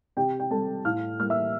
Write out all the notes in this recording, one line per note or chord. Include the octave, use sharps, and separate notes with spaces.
C3 G4 G5
G5
G3 C4 A4 A5
A2 F5 F6
E3 G3 A#3 F6
E5 E6